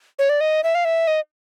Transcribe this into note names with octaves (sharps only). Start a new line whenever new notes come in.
C#5
D5
D#5
E5
F5
E5
D#5